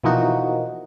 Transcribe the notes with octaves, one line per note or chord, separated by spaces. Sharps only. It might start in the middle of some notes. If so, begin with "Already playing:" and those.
B2 E3 F3 A#3 D#4 F#4